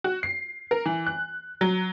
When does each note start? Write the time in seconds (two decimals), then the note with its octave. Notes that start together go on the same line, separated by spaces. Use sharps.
0.04 F#4
0.23 C7
0.71 A#4
0.86 E3
1.06 F#6
1.61 F#3